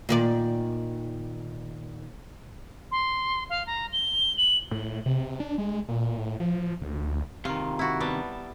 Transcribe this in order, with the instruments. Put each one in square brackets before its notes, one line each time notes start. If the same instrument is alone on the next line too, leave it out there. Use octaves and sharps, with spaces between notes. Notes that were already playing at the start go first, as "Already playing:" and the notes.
[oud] A#2 D#3 D5
[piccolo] C6
F5
A#5
G7
F#7
[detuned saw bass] A2
C3
D4
G#3
A#2
A2
F3
D2
[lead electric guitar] C3 D#3 [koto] F4
[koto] E4 F#4
G3 B3 A5